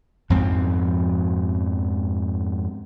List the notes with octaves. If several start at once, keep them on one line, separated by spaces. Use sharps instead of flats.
F2 G#2 F3 C4